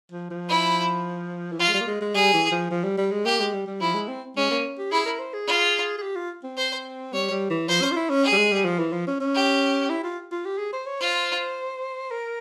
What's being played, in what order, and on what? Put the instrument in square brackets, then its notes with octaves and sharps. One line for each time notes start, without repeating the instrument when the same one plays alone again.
[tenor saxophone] F3
F3
[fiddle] E4
[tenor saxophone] E3
[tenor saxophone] F3 [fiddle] F4
[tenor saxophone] G#3
G3
A#3
G#3
G#3
[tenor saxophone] G3 [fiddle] G#4
[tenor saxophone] E3
F3
F3
G3
G3
G#3
[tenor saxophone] A#3 [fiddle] G4
[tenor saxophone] G#3
G3
G3
[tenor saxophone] F3 [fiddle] E4
[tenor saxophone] G#3
C4
[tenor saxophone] G#3 [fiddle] C#4
[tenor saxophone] A#3
G4
[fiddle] E4 [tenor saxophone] G#4
[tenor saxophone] A#4
C5
G#4
[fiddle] F4
[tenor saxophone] G#4
G4
F4
C4
[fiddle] C5
[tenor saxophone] G3 [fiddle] C#5
[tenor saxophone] G3
E3
[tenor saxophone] F3 [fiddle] C5
[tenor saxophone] C#4
F4
E4
C#4
[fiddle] G#4
[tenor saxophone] G3
G#3
G3
F3
E3
F3
C#4
C#4
[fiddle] G4
[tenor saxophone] E4
F4
F4
G4
G#4
C5
C#5
[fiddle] F4 [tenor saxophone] C5
[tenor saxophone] A#4